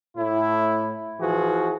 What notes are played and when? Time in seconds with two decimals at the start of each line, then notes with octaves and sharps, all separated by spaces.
0.17 A2 E4
1.20 E3 F3 F#4 G#4